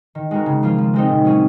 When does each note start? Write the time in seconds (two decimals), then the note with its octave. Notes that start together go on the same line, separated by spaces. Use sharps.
0.15 D#3
0.31 G#3 C4 F#4 A#4
0.46 C#3
0.63 F3 A#3 F4
0.78 F3
0.93 G#3 C4 D#4
1.09 A#2
1.25 F#3 C#4 G#4